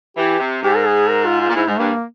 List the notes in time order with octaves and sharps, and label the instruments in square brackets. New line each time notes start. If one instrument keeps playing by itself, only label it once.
[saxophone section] E3 [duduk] G4
[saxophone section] C3
[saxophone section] G#2 [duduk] G4
[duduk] A#4
G#4
A#4
F4
F4
[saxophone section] A#2
[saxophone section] G#2 [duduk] E4
[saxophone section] G#2 [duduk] G#3
[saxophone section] G2 [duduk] A#3